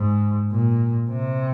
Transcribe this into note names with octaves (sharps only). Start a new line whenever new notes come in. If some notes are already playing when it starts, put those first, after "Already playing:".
Already playing: G#2
A#2
C3